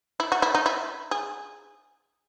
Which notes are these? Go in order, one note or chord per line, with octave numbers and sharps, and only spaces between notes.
E4
F#4
E4
D#4
E4
G#4